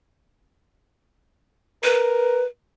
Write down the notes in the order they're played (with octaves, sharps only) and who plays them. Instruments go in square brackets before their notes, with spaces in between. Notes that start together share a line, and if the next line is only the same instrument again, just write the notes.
[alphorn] A#4 [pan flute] B4